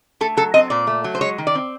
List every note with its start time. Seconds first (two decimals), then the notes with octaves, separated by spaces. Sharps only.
0.21 A3 A4
0.37 F#3 A4
0.54 C4 D#5
0.70 A#2 D5
0.87 A3
1.04 F#3
1.15 C5
1.21 G#3 C#5
1.38 D#3
1.47 D5
1.55 C4